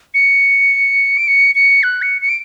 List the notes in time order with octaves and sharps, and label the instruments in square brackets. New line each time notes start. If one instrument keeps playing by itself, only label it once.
[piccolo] C#7
D7
C#7
C#7
F#6
C#7
C#7
D7